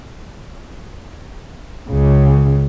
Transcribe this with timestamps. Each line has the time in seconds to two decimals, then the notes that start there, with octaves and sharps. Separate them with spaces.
1.90 C#2 C#3